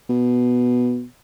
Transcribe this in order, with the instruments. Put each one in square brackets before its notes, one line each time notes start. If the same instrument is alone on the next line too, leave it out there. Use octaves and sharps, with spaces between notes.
[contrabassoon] B2